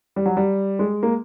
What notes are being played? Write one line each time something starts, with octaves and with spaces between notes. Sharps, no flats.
G3
F#3
G3
G#3
A#3